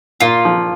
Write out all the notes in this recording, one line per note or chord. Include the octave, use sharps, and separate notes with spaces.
A#2 F4
F3